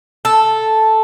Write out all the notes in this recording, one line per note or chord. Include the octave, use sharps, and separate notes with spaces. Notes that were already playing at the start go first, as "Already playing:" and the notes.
A4